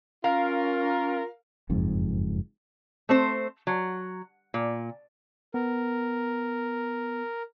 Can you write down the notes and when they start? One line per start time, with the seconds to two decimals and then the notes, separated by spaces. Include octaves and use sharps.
0.24 C#4 F4 A#4 F5
1.69 F#1 F2 G#2
3.09 A3 C4 C5
3.67 F#3
4.54 A#2
5.54 B3 A#4